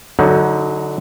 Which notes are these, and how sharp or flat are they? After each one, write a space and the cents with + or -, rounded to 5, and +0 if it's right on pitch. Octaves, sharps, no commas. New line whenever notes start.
D3 +0 F#3 +10 D#4 +30